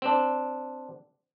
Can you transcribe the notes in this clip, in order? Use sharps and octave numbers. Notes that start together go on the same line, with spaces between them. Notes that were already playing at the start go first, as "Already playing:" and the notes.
C4 D4